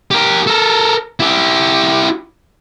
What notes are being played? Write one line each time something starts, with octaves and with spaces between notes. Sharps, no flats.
G4 A#4
A4 A#4
E4 G4